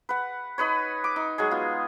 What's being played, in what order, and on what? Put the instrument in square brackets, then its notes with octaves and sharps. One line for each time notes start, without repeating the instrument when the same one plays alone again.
[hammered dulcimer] B4 F#5
D#4 B4 C#5
D6
D#4
F#3 G#3 G#4
B3 F4